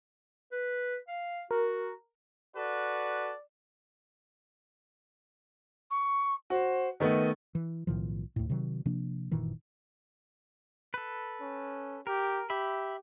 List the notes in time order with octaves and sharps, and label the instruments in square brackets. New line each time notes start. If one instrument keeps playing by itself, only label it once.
[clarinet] B4
F5
[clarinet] F#4 [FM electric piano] A#4
[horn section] F#4 A4 B4 [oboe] D5
[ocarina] C#6
[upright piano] F#4 [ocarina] C5
[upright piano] D#3 A3 B3 [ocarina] D#5
[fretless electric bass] E3
B1 A2 D#3 F3
D2 A2
C3 D#3 F#3
C3 F3 A#3 D4
F#1 A#2 D#3 E3
[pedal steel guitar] A4 B4
[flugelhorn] C#4
[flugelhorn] G4 [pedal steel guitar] A#4
[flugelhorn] G4 [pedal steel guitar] E5 B5